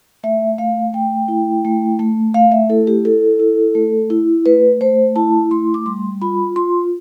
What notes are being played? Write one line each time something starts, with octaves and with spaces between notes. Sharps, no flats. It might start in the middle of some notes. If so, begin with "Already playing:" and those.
A3 E5
A3 F5
A3 G5
E4
A3
A3
A3 F5
E5
E4 A4
G4
E4 A4
E4
A3
E4
A3 B4
A3 C5
E4 A5
A3 C6
D6
G3 C6
F4 B5
F4 C6